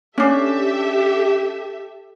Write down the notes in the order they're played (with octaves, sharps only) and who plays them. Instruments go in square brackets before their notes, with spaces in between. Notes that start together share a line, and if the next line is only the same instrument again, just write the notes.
[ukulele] C#4 D4 [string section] G4 A4 E5